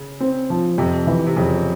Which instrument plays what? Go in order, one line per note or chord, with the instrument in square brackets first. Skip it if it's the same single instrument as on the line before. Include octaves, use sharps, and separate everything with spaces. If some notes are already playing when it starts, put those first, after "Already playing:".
Already playing: [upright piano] C#3
[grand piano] C4
F3
[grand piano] F2 [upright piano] C3
[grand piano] E3
[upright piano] C3
[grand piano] F2 [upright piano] C#3